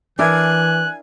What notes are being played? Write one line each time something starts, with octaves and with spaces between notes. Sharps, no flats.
E3 D4 E4 A#4 G#5 F#6